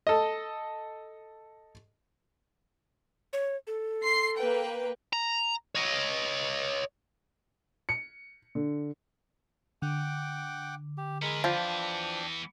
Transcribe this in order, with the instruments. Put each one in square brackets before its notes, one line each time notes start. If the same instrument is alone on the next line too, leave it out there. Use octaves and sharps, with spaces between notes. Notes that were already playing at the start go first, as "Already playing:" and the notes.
[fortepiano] A4 D#5
[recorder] C#5
A4
[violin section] C6 C7
A#3 B4 G5
[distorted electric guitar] A#5
C#5 D#5
[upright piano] C#7
D3
[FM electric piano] D3 [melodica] F#5 G5 D6
[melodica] G4
[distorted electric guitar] E3 B3 [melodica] G#3 A#4 B5
[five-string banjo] F3 [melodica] D4 G5